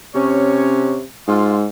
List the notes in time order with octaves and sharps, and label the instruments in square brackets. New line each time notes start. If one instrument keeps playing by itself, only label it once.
[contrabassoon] C3 [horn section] C#4 C#5
[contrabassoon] G#2 [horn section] F4 C6